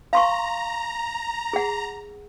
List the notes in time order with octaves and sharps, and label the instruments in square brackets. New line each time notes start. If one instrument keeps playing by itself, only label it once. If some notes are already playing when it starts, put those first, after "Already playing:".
[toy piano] F5 C6 C#6 [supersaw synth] A#5
[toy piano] G#4 F#5